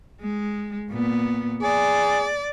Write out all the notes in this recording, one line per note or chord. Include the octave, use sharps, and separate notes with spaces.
G#3
A#2 B3
G#4 D5